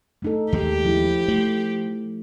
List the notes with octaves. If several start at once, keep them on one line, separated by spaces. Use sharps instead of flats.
A3 D#4 A4
D#2 G#3 G4
F3 E4
F3 A3